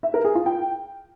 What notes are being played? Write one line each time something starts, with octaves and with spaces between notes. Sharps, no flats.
E5
A#4
G#4
F4
G5